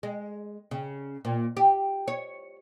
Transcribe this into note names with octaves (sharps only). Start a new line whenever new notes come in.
G#3
C#3
A#2
G4
C#5